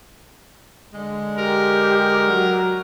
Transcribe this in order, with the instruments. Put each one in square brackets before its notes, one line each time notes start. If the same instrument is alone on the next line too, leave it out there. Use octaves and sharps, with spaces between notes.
[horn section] D3 G#3
[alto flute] G4 [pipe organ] A#4
[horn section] F#3